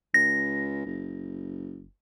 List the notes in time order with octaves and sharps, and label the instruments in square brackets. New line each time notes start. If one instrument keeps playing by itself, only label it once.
[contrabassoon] C#2 [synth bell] A#6
[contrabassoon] F#1